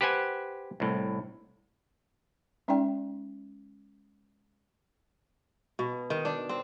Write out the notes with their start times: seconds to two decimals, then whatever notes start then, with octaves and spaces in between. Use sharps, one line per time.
0.01 G4 B4 C5 F#5 G#5
0.80 C2 A2
2.68 G#3 C#4 D#4 D5 G5
5.79 B2
6.10 D#3
6.25 D4
6.49 C4